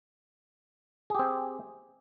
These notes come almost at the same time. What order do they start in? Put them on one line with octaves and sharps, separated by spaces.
G#4 G4 C4